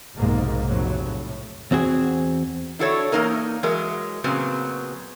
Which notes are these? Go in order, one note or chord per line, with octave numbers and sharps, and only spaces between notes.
F1 B1 G#2 A#3
F1 A2 F#3
A2
E2 C4 F#4 G#4
D4 E4 F#4 A4 A#4 C#5
E2 C#3 A#3 D#4 A#4
E3 F#3 G#3 A#4 D#5
A#2 C#3 F#3 B3 C4